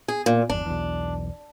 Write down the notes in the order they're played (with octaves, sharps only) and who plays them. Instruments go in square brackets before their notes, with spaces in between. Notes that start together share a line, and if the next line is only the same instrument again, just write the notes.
[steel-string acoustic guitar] G#4
A#2
[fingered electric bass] G1 E2 [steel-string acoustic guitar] D4
[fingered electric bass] B1 E2